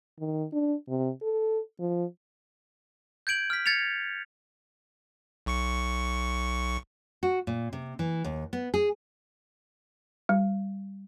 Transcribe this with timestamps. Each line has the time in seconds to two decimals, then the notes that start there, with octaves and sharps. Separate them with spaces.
0.20 D#3
0.53 D4
0.88 C3
1.22 A4
1.80 F3
3.27 G6 G#6 D7 F#7
3.50 F6 B6
3.66 G#6 A6 C#7 F7
5.46 B1 C#6 C#7
7.23 F#4
7.47 A#2
7.73 C3
7.99 E3
8.25 D#2
8.53 B3
8.74 G#4
10.29 G3